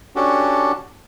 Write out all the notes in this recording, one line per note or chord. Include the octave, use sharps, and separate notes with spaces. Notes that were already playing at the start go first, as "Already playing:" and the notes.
C#4 D4 F#4 G4 A4